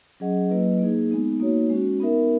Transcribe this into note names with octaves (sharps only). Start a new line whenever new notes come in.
F#3 C#4 G#4 D#5 F#5
F#3 A#3 E4 B4 D#5
A#3 D#4 G#4
G#3 B3 D#4
A#3 D#4 F#4 C#5
G#3 C#4 F#4
B3 D#4 A#4 E5